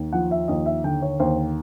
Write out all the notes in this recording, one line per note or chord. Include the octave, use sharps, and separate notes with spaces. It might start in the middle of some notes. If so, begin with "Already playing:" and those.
Already playing: D#2
F3 F#5
E5
D#2 D#5
E5
D3 G5
C#5
D#2 C5